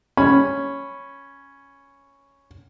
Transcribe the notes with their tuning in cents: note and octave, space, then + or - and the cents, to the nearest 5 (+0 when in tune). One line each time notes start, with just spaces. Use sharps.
C#4 +0 B5 +0